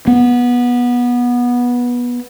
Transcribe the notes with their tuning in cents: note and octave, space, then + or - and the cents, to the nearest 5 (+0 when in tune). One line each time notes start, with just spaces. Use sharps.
B3 -20